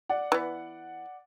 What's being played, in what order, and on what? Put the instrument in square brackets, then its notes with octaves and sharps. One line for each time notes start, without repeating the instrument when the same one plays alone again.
[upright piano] D5 F#5
[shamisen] E3 B3